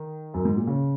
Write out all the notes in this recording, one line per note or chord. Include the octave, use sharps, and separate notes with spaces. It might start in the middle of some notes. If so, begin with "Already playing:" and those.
Already playing: D#3
F#2
G#2
A#2
C#3